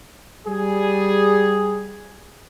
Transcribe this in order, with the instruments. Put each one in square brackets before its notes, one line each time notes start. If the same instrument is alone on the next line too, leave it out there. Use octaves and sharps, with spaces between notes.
[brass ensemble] G3 G#4